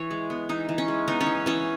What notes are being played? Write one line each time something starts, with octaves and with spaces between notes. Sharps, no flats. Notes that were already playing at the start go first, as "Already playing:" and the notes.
Already playing: E3 C#5
G#3
B3
E3 D#4
E3
C#4
G#3
B3 D#4
C#4
E3
E3 C#4